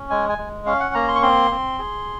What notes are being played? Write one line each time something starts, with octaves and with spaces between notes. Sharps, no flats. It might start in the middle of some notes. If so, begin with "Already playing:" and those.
Already playing: C#4
G#3 G#5
G#5
G#3
C#4 F5
F#5
A#3 A#5
C6
C#6
C4 C6
C4
G#4